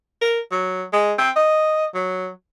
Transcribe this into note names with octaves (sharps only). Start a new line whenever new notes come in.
A#4
F#3
G#3
C4
D#5
F#3